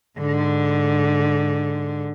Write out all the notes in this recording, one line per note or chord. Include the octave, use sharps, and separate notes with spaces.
G#2 D3